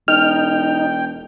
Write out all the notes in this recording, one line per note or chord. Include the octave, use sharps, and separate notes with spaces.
E1 D#4 G5 F6